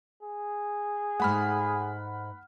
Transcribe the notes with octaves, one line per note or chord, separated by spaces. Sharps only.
G#4
G#2 A3 F#5 B5 F6